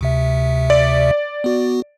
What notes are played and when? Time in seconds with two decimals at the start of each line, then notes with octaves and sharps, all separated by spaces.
0.01 D2 C3 E5
0.70 D5
1.44 B3 F#4